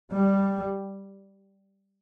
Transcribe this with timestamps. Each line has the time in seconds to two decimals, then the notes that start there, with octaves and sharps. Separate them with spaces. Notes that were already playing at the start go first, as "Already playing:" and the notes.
0.12 G3